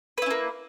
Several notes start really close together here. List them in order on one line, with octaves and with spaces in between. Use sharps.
B4 E4 C#4 A#3